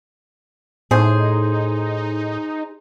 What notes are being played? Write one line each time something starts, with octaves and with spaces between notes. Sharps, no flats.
A2 D#4 G#4 C5